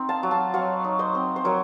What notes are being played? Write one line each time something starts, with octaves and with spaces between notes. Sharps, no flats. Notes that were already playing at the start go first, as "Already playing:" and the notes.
Already playing: C4 D#4
F5 A5
F#3
F5 A5
F#3 C#5 F5
D#4
C5 D#5
C4
C5
F#3 A#4 C#5